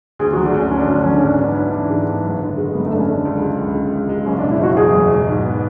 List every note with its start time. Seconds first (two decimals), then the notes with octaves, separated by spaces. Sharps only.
0.19 D2 G#4
0.33 F#4
0.37 F#3
0.45 D4
0.54 D2 C#4
0.71 D3 C#4
0.79 D4
0.87 D2 C#4
0.94 D4
1.02 F#3 C#4
1.10 D4
1.17 C#4
1.22 G#2 D4
1.32 C#4
1.38 B3 D4
1.48 C#4
1.55 E4
1.72 E3 D4
1.90 G#2
2.06 B3
2.24 F#1
2.40 D3
2.57 G#3
2.74 F#2 B3
2.86 A3
2.91 F#1 D4
2.99 C#4
3.07 D3 D4
3.25 C#2
3.41 G#3
3.58 C#2
3.75 C#3
3.93 C#2
4.09 G#3
4.26 F#1 C#4
4.39 D4
4.43 B2
4.51 E4
4.59 F#1 F#4
4.77 E2 G#4
4.93 F#1
5.10 B2
5.27 G#2
5.44 B3